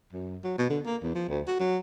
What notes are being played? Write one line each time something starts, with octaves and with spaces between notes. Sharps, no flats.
F#2
F#3
B2
D3
A#3
E2
F3
D2
F#4
F#3